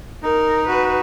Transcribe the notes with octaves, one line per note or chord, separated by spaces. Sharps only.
D#4 A#4
F#4 B4